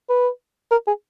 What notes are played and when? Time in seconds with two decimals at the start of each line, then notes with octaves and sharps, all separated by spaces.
0.09 B4
0.71 A#4
0.87 G#4